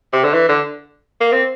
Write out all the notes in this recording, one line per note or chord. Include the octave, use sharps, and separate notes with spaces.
C3
D3
E3
D3
A#3
C4